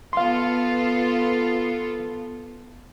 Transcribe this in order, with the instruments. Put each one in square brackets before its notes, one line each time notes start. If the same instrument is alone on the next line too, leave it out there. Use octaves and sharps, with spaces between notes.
[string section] B3 F4 A4 [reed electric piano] F5 C6